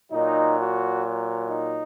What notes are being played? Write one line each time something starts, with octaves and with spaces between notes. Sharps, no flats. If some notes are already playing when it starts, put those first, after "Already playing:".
A#2 F#3 D#4
F#4
D#4